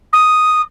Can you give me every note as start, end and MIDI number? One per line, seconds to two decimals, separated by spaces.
0.13 0.62 87